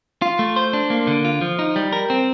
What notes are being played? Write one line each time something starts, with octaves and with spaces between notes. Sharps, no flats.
F4
A3
C5
D4
A#3
D3
F4
F3
D#4
G3
A#4
C4